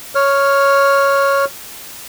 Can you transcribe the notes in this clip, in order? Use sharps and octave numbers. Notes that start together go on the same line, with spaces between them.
C#5 F6